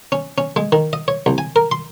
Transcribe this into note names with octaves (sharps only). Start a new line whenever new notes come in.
C#4
C#4
G#3
D#3
D#5
C#5
C2
G#5
A#4
C6